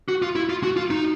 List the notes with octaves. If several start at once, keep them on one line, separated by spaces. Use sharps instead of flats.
F#4
F4
E4
F4
F#4
F4
D#4